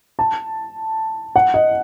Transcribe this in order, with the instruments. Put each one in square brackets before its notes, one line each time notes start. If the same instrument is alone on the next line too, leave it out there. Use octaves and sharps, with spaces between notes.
[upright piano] A5
F#5
D#5